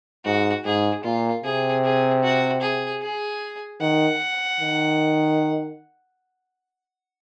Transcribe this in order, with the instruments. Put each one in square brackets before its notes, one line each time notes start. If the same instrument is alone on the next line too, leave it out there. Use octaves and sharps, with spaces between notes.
[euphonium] G#2 [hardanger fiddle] F#4
[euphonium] G#2 [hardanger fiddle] G#4
[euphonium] A#2 [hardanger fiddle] F4
[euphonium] C3 [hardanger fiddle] G#4
[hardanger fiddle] G#4
F#4
G#4
G#4
[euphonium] D#3 [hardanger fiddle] F#5
[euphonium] D#3